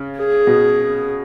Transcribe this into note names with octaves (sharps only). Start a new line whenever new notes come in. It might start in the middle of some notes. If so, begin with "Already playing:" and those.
Already playing: C#3
G#4
B2